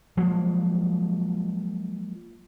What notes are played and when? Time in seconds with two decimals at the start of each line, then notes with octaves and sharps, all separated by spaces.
0.17 F3 F#3 G#3 A#3